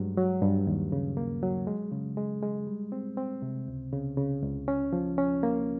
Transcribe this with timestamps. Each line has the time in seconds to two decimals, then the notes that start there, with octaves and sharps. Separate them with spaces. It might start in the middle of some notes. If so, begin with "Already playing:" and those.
Already playing: G2 F#3 G#3
0.17 F#3
0.42 G2
0.67 D#2
0.92 C#3
1.17 A#3
1.43 F#3
1.67 G#3
1.92 C#3
2.17 G#3
2.43 G#3
2.67 G3
2.92 C4
3.17 C4
3.42 C3
3.68 C#2
3.93 C#3
4.17 C#3
4.43 C#2
4.68 C#4
4.93 F3
5.18 C#4
5.43 A#3